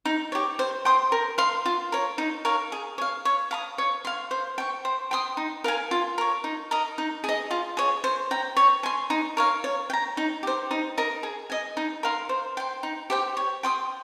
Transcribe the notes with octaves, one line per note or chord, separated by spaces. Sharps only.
D#4
G4 C#5
C5
G5 C6 D#6
A#4
F5 C6
F4
A#4 C#5
D#4
A#4 C#5 F5
G#4
C#5 F5
C#5
F5 A#5 D#6
C#5
F5 C6
C5
G5 C#6
C5
G5 C6 D#6
D#4
A#4 F5 G#5
F4
A#4 C#5
D#4
A#4 D#5
D#4
G#4 D#5
F4
G#4 C#5
C5
G5 A#5
C#5
G#5 C6
D#4
A#4 C#5 F5
C#5
G5
A#5
D#4
G4 C5
D#4
A#4 D#5 A#5
G#4
D#5 G#5
D#4
A#4 F5 C6
C5
G5 C6
D#4
G4 C5 G5
C#5
G5 C6 D#6